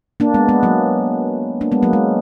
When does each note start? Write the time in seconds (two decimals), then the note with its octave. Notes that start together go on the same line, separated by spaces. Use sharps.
0.20 A#3 D4
0.34 G#3 B3
0.49 G#3 B3
0.63 F#3 A#3
1.61 A#3 D4
1.72 G#3 B3
1.83 F#3 A#3
1.93 G#3